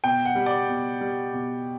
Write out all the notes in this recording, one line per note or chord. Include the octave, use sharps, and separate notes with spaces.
B2 G5
F#5
G3
D5
B2
G3
B2